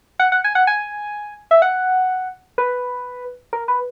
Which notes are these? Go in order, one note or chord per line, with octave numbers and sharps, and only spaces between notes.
F#5
F#5
G#5
F#5
G#5
E5
F#5
B4
A#4
B4